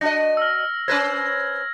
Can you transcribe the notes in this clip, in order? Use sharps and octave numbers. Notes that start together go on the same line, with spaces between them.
D4 F#4 D#5 A#6
E6 F6
C#4 B4 C5 G#6 A#6